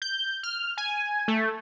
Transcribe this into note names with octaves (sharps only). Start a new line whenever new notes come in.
G6
F6
G#5
A3